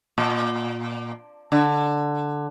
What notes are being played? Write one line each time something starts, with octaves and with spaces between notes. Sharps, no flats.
A#2
D3